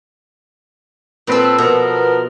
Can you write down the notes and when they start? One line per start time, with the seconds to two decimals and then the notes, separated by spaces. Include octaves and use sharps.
1.27 A#2 C4 A4 B4
1.58 B2 F3 B3 A#4